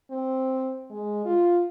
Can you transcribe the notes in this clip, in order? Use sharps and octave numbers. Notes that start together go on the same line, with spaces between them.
C4
G#3
F4